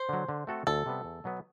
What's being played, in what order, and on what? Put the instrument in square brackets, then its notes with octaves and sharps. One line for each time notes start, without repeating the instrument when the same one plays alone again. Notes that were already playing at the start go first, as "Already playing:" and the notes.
Already playing: [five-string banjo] C5
[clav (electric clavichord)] D3 F#3
D3
A3 C4 F#4 A4
[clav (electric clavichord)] D2 [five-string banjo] A4
[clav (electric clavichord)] C3 G3 B3
E2
B2 F#3 B3